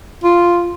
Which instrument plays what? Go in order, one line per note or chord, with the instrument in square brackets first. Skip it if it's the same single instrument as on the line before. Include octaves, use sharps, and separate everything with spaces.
[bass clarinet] F4